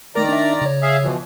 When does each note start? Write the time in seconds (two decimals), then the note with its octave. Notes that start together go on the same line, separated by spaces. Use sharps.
0.15 D#3 A3 A#4 D5 A#5
0.29 D4 E5
0.62 C#3 C#5
0.82 G#4 E5 F5
1.03 B2 E3 F3